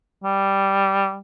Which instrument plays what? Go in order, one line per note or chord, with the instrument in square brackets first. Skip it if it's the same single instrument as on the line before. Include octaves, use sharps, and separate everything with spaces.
[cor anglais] G3